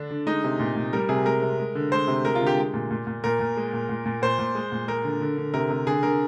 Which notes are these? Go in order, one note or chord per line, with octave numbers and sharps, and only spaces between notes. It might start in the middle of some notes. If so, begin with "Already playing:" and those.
Already playing: D3 D4
D3
G#3 D#4
C3
A#2
A#2
G3 A#4
C3 G#4
G#3 A#4
C3
G#3
D3
G#3 C5
C3
G#3 A#4
F4
D3
G4
G#3
A#2
A#2
A#2
A#2 A#4
A#2
G#3
A#2
A#2
A#2
A#2 C5
A#2
G#3
A#2
G#3 A#4
D3
D3
D3
C3 A#4
C3
D3 G#4
D3 A#4